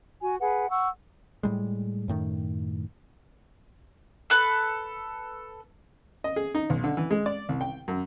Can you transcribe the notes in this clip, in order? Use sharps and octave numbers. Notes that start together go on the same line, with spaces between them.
F#4 G#5
G#4 B4 F#5
F#5 C#6 E6
A2 G3 G#3
F#2 A2 D#3
A4 B4
D#5
G#4
D#4
B1
D3
E3
G#3
D5
C2
G5
F#2